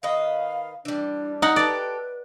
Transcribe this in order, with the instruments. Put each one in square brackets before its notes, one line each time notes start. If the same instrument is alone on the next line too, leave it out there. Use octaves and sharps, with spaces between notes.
[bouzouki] D#3 B4 D#5 [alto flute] F5
[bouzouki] E3 G3 [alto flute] D4
[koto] D#4 F#5
[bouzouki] G4 A4 [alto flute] B4 [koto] D5